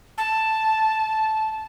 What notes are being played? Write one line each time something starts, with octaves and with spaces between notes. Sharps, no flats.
A5